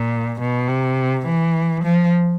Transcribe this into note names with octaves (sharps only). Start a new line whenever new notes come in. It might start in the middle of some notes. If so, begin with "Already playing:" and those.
Already playing: A#2
B2
C3
E3
F3